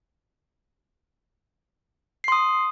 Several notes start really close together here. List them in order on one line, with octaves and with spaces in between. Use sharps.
C7 C6 D#6